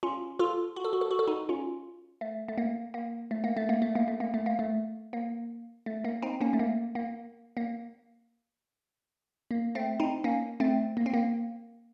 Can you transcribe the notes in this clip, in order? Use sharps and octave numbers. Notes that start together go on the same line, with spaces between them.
C#4 F4
F4 A4
F#4
A4
F#4
A4
F#4
A4
D#4 F#4
C#4 F4
A3
A3
A#3
A#3
A3
A#3
A3
A#3
A3
A#3
A3
A#3
A3
A#3
A3
A#3
A3
A#3
C4 D#4
A#3 C#4
A3
A#3
A#3
A#3
A#3
A3 C4
C4 D#4
A#3 C#4
A3 C4
A#3
C4
A#3